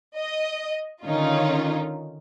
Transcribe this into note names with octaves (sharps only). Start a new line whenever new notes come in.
D#5
D3 D#3 C#4 D#4 F4